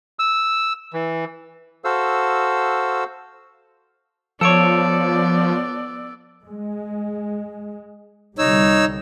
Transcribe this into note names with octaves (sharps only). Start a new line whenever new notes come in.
E6
E3
F#4 A4 C5 F5 E6
F3 B3 A4 C#5 D5 E6 D7
G#3
C2 D3 G3 D#4 C#5 E6